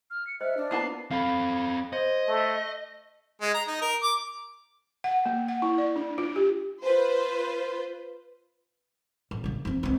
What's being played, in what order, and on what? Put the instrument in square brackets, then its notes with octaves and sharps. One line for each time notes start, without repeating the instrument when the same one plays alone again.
[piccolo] F6
C#7
[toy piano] C5 D#5 [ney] E5 [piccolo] F6
[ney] D4
[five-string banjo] A#3 B3 A5 [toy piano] E4 F4 [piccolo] C7
[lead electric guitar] C4 A4 [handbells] F5 B5
[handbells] C5 G#6 [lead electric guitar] D#5
[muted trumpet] A3
[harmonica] G#3
A#5
D#4
A#4
D6
[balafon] F#5
A#3
F#5
E4
D5
D4
F4
G4
[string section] F4 B4 C5
[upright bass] A1
C#3 C#4
F3 C4
C#2 C4